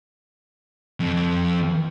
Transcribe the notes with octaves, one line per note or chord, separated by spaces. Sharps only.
F2